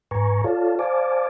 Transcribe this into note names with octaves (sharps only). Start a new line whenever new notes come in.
G#2 B4 G#5 A#5 C#6
F4 A4 C#5 D5 F5 A5
C5 D5 F5 G#5 A5 D6